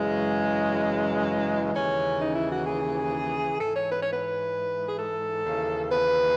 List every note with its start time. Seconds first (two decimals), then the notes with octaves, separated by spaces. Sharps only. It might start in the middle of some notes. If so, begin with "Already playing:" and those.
Already playing: F#2 C#3 E3 G#3
1.73 D#2 C#3 E3 C#4
2.19 D#4
2.35 E4
2.51 F#4
2.66 G#4
3.59 G#2 E3 A4
3.74 C#5
3.90 B4
4.01 C#5
4.11 B4
4.89 G#4
4.98 A4
5.45 D#2 C#3 E3
5.91 B4